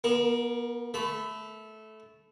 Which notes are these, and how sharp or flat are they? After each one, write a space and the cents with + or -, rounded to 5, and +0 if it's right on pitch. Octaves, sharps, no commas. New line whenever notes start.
B3 -40 A#4 +0
A3 -15 B5 +20